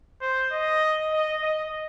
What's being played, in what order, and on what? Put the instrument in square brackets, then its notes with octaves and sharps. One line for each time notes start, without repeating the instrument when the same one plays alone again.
[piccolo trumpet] C5
D#5
D#5
D#5